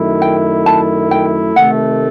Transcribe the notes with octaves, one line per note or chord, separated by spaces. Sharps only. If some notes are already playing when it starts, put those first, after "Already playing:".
Already playing: F#2 D#3 A3 E4
G5
A5
G5
C3 D#3 A3 F#5